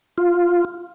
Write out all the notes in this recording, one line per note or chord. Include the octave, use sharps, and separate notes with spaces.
F4